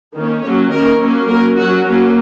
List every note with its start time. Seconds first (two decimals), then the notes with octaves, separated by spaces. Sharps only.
0.14 D#3 A#3 C#4
0.43 F#3 A#3 C#4 C#5
0.71 D#3 A#3 C#4 A#4
1.00 F#3 A#3 C#4
1.28 F#3 C#4 A#4
1.56 F#3 C#4 F#4
1.84 F#3 A#3 C#4